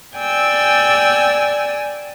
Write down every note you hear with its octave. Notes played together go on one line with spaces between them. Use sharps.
D5 G5 G#5 E6